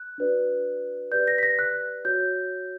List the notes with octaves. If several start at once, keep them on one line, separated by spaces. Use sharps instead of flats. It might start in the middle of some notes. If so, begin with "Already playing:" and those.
Already playing: F#6
D4 F#4 B4 D5
G4 B4 D5 G6
A#6
B6
A#6
F#6
F#4 C#5 G6